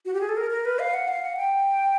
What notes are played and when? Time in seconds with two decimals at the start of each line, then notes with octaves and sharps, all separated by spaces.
0.06 F#4
0.14 G4
0.21 G#4
0.29 A4
0.37 A#4
0.51 A#4
0.65 B4
0.79 F5
0.94 F#5
1.08 F5
1.23 F#5
1.37 G5